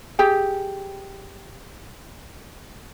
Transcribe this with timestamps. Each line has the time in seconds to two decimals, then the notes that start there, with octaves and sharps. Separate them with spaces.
0.19 G4 G#4 G5